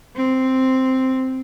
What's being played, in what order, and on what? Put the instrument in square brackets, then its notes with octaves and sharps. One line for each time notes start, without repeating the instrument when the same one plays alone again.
[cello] C4